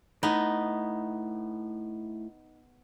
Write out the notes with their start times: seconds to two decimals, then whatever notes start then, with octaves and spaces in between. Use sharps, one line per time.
0.23 A2 B3 D#4